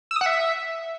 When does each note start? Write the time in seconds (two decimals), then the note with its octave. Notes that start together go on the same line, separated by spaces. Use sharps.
0.11 E6
0.16 D#6
0.21 F#5
0.26 E5